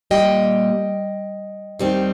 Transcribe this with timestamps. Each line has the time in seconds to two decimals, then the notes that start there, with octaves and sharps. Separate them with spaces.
0.10 A#2 G3 A#3 D#5 G5
1.79 D#2 D#3 G3 C4